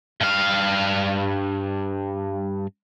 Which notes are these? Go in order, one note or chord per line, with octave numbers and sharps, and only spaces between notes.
G2 F5